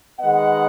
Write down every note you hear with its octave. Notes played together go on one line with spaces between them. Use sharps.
D#3 G#3 B3 D#5 F#5